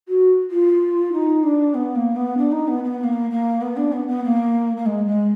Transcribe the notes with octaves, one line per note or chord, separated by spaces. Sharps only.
F#4
F4
D#4
D4
B3
A#3
B3
D4
D#4
B3
B3
B3
A#3
A#3
B3
D4
B3
B3
A#3
A#3
G#3
G#3